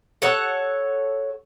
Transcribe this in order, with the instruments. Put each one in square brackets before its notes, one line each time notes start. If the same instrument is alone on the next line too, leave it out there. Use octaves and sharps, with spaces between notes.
[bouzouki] A4 C#5 F#5